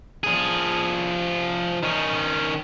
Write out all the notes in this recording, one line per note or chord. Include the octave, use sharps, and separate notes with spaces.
F3 G#4
D#3 C#4